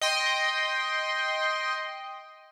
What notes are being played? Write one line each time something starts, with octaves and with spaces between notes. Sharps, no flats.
D#5 G5 C6